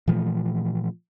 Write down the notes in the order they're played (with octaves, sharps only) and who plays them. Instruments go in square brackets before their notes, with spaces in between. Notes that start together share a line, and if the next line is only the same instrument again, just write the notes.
[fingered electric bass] A#2 E3 F3 A3